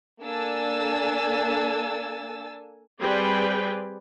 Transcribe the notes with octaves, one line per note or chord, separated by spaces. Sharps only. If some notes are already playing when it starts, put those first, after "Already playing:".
A#3 D4 A4 G#5 E6 A6
G3 C4 G#4 B4 D5 G5